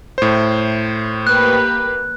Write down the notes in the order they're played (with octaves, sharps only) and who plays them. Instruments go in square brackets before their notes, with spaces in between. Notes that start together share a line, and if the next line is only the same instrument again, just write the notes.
[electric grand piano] A2 C5
[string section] A#3 G4 B4 [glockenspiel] F#6